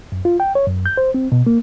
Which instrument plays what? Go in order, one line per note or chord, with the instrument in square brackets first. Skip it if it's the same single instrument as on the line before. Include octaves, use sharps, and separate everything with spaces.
[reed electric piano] F#2
F4
G5
C#5
F#2
G6
C5
C4
B2
A#3